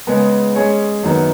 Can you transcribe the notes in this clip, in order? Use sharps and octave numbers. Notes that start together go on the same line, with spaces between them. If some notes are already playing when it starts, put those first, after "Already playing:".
C#3 G#3 B3
G#3 C#4 G#4 C#5
F#2 D#3 B3